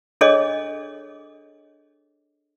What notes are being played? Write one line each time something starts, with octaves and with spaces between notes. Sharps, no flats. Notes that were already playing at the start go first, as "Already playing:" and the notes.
D4 G#4 A4 C#5 D#5 D6